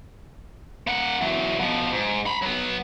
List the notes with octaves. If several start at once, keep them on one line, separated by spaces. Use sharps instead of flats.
A#3 F#5
E3 F#3
B2 F3
G#2
A#5 B5
F#3 B3